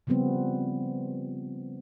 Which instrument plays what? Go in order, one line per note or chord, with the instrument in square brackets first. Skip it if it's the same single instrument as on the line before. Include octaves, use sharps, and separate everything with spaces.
[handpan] C#3 F3 G3 B3 C4